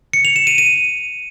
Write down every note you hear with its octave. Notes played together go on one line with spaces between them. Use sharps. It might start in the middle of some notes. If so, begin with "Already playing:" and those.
C#7
F7
E7
D#7
D#7